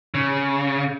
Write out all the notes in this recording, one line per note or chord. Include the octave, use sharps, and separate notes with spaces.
C#3